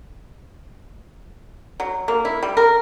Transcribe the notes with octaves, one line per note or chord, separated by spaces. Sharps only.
F#3
A#3
E4
G3
A#4